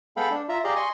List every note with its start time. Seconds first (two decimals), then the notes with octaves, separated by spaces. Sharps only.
0.17 G#3 B3 A4 F5 G5 B5
0.31 D4
0.49 F4 E5 A#5
0.64 G4 G#4 D5 D#5 F5 A#5
0.76 D#5 G#5 C6 C#6